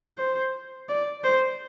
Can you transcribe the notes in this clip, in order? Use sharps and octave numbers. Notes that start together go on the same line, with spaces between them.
C5
D5
C5